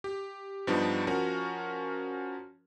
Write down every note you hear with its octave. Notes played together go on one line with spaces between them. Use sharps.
G4
G2 F3 G3 B3 D4 D#4
F3 C#4 F#4 A#4